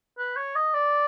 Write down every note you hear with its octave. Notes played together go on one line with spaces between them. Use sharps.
B4
C#5
D#5
D5